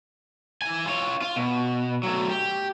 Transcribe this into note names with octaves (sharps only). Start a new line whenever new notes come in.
E3 G#5
F4 C#5
F4
B2
F#3 A3
G4